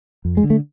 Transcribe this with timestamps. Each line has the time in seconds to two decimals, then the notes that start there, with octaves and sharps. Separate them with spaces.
0.25 F2
0.37 G#3
0.44 D3
0.50 A3